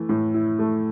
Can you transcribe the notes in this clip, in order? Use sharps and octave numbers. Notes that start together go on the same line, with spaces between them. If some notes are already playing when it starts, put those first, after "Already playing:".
Already playing: E3 A3 E4
A2
E4
A3